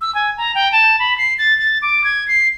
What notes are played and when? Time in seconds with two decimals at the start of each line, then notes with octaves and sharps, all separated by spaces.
0.01 E6
0.15 G#5
0.38 A#5
0.55 G5
0.72 A5
0.99 B5
1.18 C7
1.38 A6
1.58 A6
1.82 D6
2.04 G#6
2.28 C7